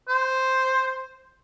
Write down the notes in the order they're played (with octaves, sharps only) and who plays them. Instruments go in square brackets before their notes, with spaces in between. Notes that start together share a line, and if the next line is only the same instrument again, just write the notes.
[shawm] C5